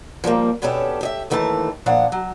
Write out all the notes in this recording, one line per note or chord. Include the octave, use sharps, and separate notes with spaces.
F3 G3 G#3 A#3
B2 B3 C#4 D4 G4 A4
G4 D#5 E5
D#2 D#3 E3 A3 G#4 A5
A#2 F3 D4 F5 F#5
F#3